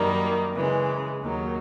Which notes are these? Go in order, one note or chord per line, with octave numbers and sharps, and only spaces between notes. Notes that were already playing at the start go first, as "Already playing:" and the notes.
Already playing: F#2 D#3 G3 A#3
C#3 E3 G#3
D#2 D#3 F#3